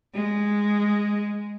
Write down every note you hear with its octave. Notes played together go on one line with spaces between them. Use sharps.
G#3